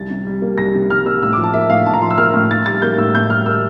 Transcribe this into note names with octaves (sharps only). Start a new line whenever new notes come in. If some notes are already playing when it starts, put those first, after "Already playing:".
Already playing: C2 A6
C3
G3
A#3
C2 A#6
C3
G3 F6
A#3 E6
A2 E6
F3 D6
A5
A#3 E5
A2 F5
A2 A5
A#5
F3 C6
E6
A#3 F6
A2
A2 A6
G3 A6
A#3 G6
A2 E6
A2 G6
G3 F6
A#3 E6